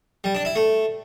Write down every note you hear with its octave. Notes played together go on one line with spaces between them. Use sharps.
G3
D4
E4
A3